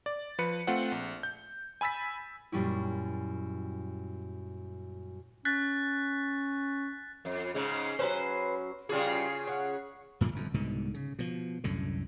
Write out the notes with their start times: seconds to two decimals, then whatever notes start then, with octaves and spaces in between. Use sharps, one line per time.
0.06 D5
0.38 F3 B4 C#7
0.67 A3 C4 F4 C5 F#5
0.92 A#1
1.23 G6
1.81 G#5 B5 E6 A6 B6
2.52 F#2 A#2 G3 C#4 E4
5.45 C#4 F#6 A6 B6
7.25 F2
7.54 G#2 C#3 G#3
7.99 F#3 B3 C#4 B4 C5
8.89 C#3 E3 G3 F4 G#4
9.47 C#5 F#5
10.21 F#2 A#2 D3 F3
10.32 G1 F2
10.54 C2 G#2 B2 D3
10.94 C#3
11.19 B2 F3
11.64 C2 F#2 A2 D3